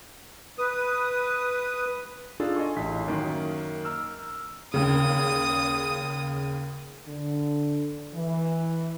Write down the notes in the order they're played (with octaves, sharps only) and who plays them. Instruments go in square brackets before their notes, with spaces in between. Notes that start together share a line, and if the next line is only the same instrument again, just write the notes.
[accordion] B4 D#6
[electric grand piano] D4 D#4 F4 G#4 A4
D#5 G#5 C#6
A1 E4 C6 B6
F#2 D#3 A#3
A#5 E6 F6
[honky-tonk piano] D#2 C#3 [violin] D#6
[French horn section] D3
E3